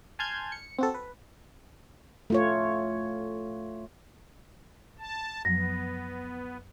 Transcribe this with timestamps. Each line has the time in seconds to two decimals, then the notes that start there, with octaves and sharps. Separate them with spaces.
0.19 G#5 A5 C6 F6 G6 G#6
0.52 C#7
0.78 C4 F#4 A4
0.95 B4
2.30 A3 F4 C#5
4.99 A5
5.45 F#2 F3 F#3 B3 A#6